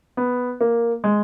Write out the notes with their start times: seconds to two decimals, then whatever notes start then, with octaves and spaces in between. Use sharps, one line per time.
0.17 B3
0.61 A#3
1.04 G#3